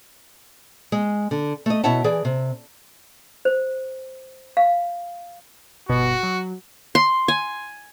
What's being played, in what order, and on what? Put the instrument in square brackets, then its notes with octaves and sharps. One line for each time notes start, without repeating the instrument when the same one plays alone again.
[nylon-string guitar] G#3
D3
A3 D#5
B2 E4 C#5 E5 F#5 A5
E3 G#4 D5
C3
[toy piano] C5
F5
[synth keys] G1 B2 B3 [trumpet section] F#4
[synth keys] F#3
[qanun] C6
G#5